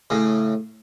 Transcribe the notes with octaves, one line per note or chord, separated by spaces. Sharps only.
A2 C#3